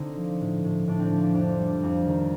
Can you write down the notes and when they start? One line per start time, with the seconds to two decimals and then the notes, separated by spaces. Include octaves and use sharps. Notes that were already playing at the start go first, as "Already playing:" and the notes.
Already playing: D3 C4 D#4
0.16 F3
0.41 A2
0.64 A2
0.88 A2 D4
0.99 C4
1.11 F3 C4
1.23 D4
1.34 F2 D4
1.59 G3
1.83 F2
2.07 D#3